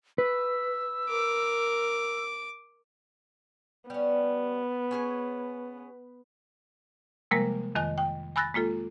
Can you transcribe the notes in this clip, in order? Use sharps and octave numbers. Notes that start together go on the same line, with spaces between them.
B4 E6
A#4 D6
G3 B3 C#4
C#4 G#4 G#5
C3 F3 G3 G#3 A#3 A#4
F2 D#3 D#5 G#5 F#6
G5
G#5 B5 E6 F#6 A6 A#6
G#3 A#3 F4 A4